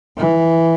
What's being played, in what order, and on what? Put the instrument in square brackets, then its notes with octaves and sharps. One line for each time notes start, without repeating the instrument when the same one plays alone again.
[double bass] E3